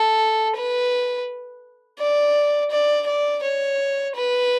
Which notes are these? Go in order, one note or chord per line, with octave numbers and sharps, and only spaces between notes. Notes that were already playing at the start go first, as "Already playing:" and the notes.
Already playing: A4
B4
D5
D5
D5
C#5
B4